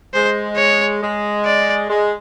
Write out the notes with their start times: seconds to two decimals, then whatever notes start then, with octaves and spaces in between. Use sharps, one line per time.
0.14 G#3 C5
0.57 C#5
1.01 G#3
1.45 D5
1.89 G#3